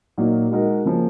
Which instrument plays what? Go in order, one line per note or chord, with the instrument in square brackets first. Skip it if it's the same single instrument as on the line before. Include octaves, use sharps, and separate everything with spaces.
[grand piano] A#2 F#3 A#3 D#4
G#3 D#4 F#4 A#4
C#3 F3 A#3